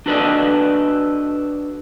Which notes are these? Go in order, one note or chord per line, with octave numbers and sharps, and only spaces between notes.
D4 F#4 A4 B4 D5 D#5